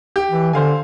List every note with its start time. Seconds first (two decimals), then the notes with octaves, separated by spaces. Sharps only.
0.16 G4
0.31 E3
0.53 D3 C5 F5 G#5